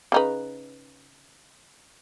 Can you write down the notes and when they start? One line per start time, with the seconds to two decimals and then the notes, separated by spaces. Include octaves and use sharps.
0.12 C#3 D#4 B4